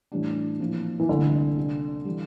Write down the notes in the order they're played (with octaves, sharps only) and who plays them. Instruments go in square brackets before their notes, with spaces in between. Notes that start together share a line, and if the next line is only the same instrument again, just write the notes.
[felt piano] A2 E3 G3 D4
A#2 F3 C4 E4
[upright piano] E3
[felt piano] C2 A#2 A3 E4 [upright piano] D3
[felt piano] C3 G3 D4
E3 G3